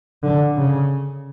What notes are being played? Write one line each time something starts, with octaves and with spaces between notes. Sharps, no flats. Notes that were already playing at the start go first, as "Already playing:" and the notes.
D3
C#3